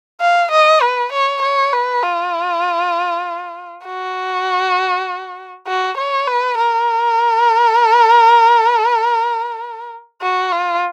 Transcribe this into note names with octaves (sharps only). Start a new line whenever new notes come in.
F5
D#5
B4
C#5
C#5
B4
F4
F#4
F#4
C#5
B4
A#4
F#4
F4